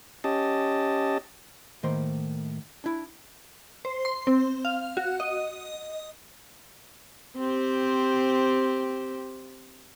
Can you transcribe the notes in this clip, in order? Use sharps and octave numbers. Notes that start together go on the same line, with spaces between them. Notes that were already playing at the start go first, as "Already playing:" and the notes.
C#4 G4 D#5 A5
A2 D#3 A#3 C5 C6
D4 E4
C5
C6
C4
F5
F#4
D#5
C4 G4 C5